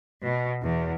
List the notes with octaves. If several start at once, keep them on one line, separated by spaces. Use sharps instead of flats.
B2
E2